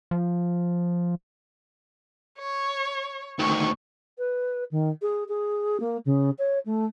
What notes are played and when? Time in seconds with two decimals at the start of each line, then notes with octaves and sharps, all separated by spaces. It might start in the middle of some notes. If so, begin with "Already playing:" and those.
0.11 F3
2.38 C#5
3.39 D2 D#3 C#6
4.18 B4
4.71 D#3
5.01 G#4
5.28 G#4
5.80 A#3
6.05 C#3
6.38 C#5
6.65 A3